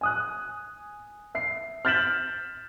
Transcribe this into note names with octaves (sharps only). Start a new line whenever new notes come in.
G#5 D#6 F#6
E5 C7
F6 G6 A6 B6 E7 F#7